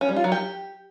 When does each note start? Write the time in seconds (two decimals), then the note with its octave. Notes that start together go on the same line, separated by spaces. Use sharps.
0.01 C#4
0.09 G3
0.16 F4
0.24 F#3
0.32 G4